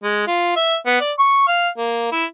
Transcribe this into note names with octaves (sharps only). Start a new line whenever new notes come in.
G#3
F4
E5
B3
D5
C#6
F5
A#3
E4